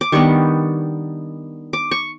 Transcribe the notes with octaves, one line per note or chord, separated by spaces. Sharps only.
D6
D#3 G3 B3 D4 C#6
D6
C#6